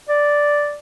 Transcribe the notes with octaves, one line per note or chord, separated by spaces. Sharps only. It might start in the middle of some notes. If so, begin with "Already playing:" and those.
D5